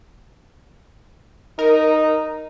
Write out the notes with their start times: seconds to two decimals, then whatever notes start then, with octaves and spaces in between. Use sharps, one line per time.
1.59 D#4 A#4